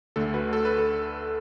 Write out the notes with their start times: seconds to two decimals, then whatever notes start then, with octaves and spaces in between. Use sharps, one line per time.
0.16 D2 D3 A3 A4
0.34 F#4 B4
0.53 A4
0.65 B4
0.78 A4